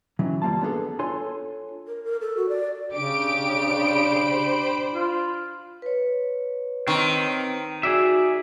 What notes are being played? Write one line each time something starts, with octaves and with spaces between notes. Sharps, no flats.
D#3 E3 F#3 C#4
G2 G3 A#3 F4 A5
A#3 B3 D4 D#4 G#4 A4
D4 F4 A4 C#5 G#5 C6
A#4
A#4
A4
F#4
D5
C#3 D4 G4 D6 D7
C5 B5
F4
B4 C#5
D#3 C4
F#4 G#4 D5 E5